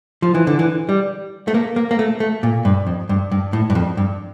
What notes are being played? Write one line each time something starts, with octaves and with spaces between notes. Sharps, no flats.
F3
E3
D3
E3
G3
A3
A#3
A#3
A#3
A3
A3
A#2
G2
F2
G2
G2
A2
G2
F2
G2